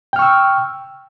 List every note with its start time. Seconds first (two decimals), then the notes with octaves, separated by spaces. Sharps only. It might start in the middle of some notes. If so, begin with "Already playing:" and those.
0.13 G5
0.16 F6
0.19 C#6
0.22 E6